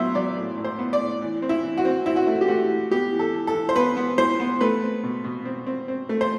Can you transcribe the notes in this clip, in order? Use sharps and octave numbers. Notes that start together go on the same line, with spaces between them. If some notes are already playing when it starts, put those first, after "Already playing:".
Already playing: A2 F#3 B3 C5 E5
F#3 D5
A2
A2
C5
B3
D5
A2
E3
C4
E4
E3
F#4
C4
C4 E4
F#4
A3 E4
G4
A3 F#4
E3
B3 G4
E3
A4
E3
A4
E3
C5
B3 B4
B3
E3 C5
B3
A3 B4
C4
B2
B2
C4
C4
C4
A3
C5